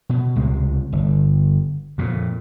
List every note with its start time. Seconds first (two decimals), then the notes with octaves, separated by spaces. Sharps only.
0.09 B2
0.36 C#2 C3 G#3
0.93 G1
1.98 F2 A#2